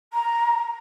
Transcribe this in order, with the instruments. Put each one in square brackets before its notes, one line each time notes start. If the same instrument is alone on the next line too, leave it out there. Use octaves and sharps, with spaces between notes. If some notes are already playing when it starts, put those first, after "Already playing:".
[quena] A#5